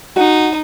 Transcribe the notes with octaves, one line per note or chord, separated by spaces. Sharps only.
D#4 F#4 F#5